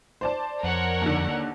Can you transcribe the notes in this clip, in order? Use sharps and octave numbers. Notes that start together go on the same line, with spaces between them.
C5 D5 A5
F2 A#4 C#5 F#5
D#2 D3